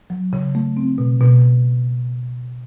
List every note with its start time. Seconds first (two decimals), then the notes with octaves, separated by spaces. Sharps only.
0.10 F#3
0.33 C#3
0.55 A3
0.77 C4
0.98 B2
1.21 B2